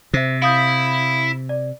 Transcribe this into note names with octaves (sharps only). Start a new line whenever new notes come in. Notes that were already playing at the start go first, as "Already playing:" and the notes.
C3 C5 E5
E4 F5 D#6 G6
D5